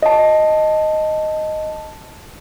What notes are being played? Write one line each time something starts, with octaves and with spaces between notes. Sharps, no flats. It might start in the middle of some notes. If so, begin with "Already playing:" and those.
D#5 A5